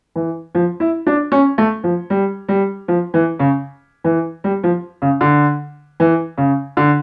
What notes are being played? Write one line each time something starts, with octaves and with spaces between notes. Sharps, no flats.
E3
F3
E4
D4
C#4
A3
F3
G3
G3
F3
E3
C#3
E3
G3
F3
C#3
D3
E3
C#3
D3